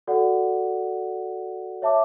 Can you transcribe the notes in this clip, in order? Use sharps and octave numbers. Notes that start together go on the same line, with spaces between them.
F#4 A4 D5 F#5
C#5 E5 A5 D6